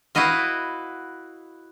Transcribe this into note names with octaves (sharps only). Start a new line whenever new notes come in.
E4 F#4 B4 D#5 F5